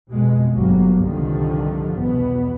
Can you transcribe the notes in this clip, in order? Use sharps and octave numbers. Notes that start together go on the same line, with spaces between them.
F2 B2 G#3
G1 F#3 A#3
C2 G2 D3 D#3 F3
E2 B2 B3